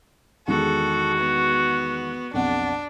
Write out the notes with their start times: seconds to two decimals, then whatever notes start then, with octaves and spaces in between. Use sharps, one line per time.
0.48 E2 D#3 G#3 F#4 A4
1.18 B3
2.34 B1 F2 D4 F#5